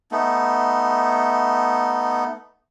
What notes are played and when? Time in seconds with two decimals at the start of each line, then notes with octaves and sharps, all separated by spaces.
0.12 A3 B3 D#4